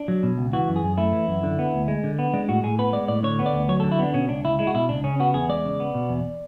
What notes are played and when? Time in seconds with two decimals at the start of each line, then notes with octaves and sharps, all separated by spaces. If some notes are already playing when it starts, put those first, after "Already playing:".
Already playing: D4
0.08 F#3
0.23 B2
0.38 C#2
0.53 E3 F#4
0.68 F#2
0.76 G#4
0.83 F#2
0.97 A3 E4
1.12 E3
1.27 F#2
1.43 D3
1.59 B3
1.74 D2
1.88 G#3
2.04 D3
2.19 B3
2.34 G#3 D4
2.49 A2 F#4
2.63 A2 G#4
2.79 B3 B4
2.93 G#3 D5
3.08 A2 D5
3.23 D3 C#5
3.39 B3
3.46 D5
3.53 D2
3.69 F#3 C#5
3.80 A4
3.84 D3
3.92 E4
3.99 B3 D4
4.13 B2 C#4
4.29 C#2 D4
4.44 C#2 E4
4.59 G#3 E4
4.67 F#4
4.74 B2 E4
4.89 C#2 D4
5.04 C#3 C#4
5.20 B3 F#4
5.34 E2 G#4
5.49 G#3 D5
5.65 C#3
5.80 B3
5.94 B2
6.09 E2